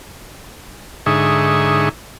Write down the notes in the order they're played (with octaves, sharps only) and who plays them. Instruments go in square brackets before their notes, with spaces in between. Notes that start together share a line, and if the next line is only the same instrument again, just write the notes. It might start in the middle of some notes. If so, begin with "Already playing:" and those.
[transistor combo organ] G#2 D3 D#4 G#4 E5 C#6